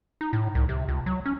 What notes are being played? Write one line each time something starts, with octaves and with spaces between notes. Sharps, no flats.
D#4
A2
C2
C3
C#2
F#3
C#4